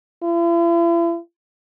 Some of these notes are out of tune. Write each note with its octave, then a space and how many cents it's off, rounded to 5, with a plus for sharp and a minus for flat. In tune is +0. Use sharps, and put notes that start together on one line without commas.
E4 +45